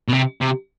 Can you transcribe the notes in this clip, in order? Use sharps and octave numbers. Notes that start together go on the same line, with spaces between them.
B2
C3
C3